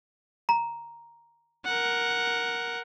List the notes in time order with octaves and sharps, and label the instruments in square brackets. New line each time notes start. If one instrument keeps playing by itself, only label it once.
[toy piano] A#5
[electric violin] A#4 F#5